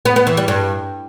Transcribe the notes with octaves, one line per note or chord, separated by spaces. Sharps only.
B3
B3
E3
G3
G2